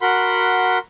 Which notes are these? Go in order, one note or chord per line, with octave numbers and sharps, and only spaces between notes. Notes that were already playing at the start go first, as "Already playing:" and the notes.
F#4 A#4 F#5 B5 C6